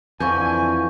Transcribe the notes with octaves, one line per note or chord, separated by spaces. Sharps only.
F2 D3 E3 F3 G#5 C#6 G6